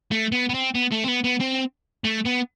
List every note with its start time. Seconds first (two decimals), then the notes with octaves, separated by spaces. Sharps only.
0.11 A3
0.32 B3
0.49 B3
0.54 C4
0.75 B3
0.92 A3
1.04 C4
1.08 B3
1.24 B3
1.40 C4
2.04 A3
2.26 B3